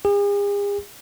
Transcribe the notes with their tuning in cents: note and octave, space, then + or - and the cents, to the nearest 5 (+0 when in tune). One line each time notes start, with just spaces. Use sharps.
G#4 -45